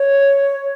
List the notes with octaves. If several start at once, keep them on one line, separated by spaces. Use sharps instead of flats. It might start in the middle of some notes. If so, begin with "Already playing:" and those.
Already playing: C#5